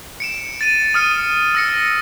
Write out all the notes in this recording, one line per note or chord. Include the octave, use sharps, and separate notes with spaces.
C#7 D7 E7
A6 D#7
D#6 F6 C#7 D#7
E6 A#6 C#7